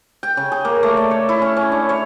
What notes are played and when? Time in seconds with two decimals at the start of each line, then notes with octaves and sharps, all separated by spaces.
0.23 G5
0.37 C#3
0.52 G#4
0.65 A#3
0.83 A3
0.97 D5
1.11 C#5
1.29 E4
1.42 C#4
1.57 C#4
1.72 D4
1.89 C#5